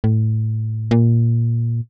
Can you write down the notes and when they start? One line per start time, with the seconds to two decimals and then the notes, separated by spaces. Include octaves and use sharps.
0.04 A2
0.91 A#2